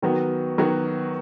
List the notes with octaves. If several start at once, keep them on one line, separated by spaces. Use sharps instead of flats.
D#3 F#3 B3 F#4
D#3 F#3 B3 F#4